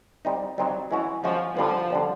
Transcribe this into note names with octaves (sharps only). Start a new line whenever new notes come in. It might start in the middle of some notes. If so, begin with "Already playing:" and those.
G3 C4 D#4
F#3 G3 C4 D#4
E3 G#3 C#4 F#4
F3 G#3 C#4 F#4
D3 F3 G3 B3
D3 G3 B3